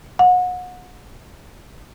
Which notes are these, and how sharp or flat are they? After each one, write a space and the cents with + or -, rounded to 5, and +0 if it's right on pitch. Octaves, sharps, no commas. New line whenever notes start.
F#5 -30